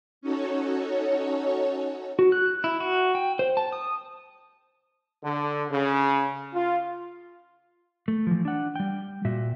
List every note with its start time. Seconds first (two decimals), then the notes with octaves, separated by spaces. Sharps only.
0.21 C#4 D#4 F#4 A4 C#5
2.19 F#4
2.32 F#6
2.64 E4
2.80 F#4
3.15 G5
3.39 C5
3.57 A5
3.72 D#6
5.23 D3
5.70 C#3
6.53 F4
8.08 A3
8.27 E3 F3
8.45 D4 F#5
8.76 G3 G5
9.25 A#2 F#4 E5